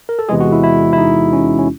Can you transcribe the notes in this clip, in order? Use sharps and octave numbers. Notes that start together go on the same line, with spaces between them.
A#4
A4
E2 C3 E3 G#3 G#4
F#4
E4
E4
E4
D#4
C#4
C#4